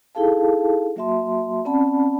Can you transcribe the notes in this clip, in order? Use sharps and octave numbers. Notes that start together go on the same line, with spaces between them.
D#4 E4 G#4 A4 F5 A5
F#3 A#3 F#4 E5 A5 C6
C4 C#4 D5 F#5 A5 B5